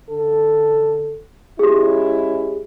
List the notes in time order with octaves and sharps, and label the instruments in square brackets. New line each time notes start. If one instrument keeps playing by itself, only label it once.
[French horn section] D3 A4
[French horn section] G#3 C#4 E4 [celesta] G4 G#4